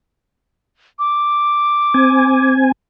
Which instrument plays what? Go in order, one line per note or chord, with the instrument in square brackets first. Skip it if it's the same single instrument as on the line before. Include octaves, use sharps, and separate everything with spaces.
[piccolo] D6
[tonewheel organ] C4 G#5